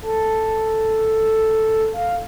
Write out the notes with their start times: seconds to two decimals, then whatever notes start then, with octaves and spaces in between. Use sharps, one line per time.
0.02 A4
1.93 F5